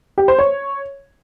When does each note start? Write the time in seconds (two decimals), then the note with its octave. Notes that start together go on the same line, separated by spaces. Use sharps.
0.18 G4
0.28 C5
0.39 C#5